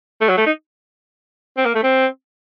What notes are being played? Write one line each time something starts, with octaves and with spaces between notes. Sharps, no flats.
A3
F#3
A3
D#4
C4
A#3
A3
C4